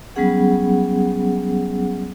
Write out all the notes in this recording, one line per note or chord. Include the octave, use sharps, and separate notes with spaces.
F#3 G3 B3 C#4 G#4 F#5